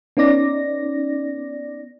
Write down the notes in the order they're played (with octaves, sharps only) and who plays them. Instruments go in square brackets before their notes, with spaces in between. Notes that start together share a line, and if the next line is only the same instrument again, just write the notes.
[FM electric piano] B3 C#4 D#4 D5 A#6